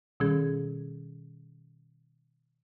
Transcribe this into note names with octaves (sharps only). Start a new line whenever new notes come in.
B2 D#3 G3 C#4 G#4 G#6